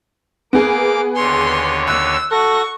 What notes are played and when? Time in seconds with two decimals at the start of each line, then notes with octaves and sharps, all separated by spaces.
0.53 A#3 B3 G#4 D6
1.16 D#2 D3 C#5 C6
1.87 E6 F#6
2.31 F#4 A4 C#6 A#6